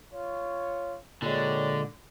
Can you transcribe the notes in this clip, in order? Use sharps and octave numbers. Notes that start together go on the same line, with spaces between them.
F4 C#5
A#2 D3 G#3 G4 A#4 C#5